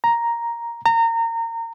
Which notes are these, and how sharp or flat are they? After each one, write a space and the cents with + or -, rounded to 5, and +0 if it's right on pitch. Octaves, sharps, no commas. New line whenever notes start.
A#5 +5
A#5 -25